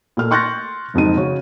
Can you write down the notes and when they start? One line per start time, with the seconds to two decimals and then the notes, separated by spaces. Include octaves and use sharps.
0.17 A#2 A3 F6
0.31 C6 C#6 F#6 G6 A6 A#6
0.94 F#1 F2 G#2 D#7
1.17 C#3 F#4 C#5